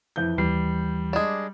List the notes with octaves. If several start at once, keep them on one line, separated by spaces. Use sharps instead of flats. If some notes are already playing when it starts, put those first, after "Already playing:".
F2 E3 G6
D#2 E3 G3 C7
G#3 D4